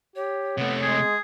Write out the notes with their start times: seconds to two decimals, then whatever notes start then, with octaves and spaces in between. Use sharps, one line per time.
0.15 G4 C#5
0.58 C3 A3 B3
0.82 G#3 G#4